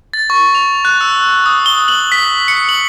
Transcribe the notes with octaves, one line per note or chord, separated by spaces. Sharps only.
A6
C#6
F7
F#6
E6
D#6
G7
F#7
B6
C#7
F#7